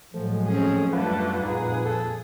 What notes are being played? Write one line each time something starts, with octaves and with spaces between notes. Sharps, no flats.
A2 F3 F#3 G#3 A3
C4 C#4 G#4
F#2 D3 G3 A3 F4 B4 F#5
F2 A#2 D#4 G#4
A4